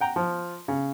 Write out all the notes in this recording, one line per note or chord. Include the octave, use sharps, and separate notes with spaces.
F#5 G5 A#5
F3
C#3